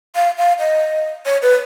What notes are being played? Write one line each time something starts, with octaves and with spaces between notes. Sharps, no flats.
F5
F5
D#5
C#5
B4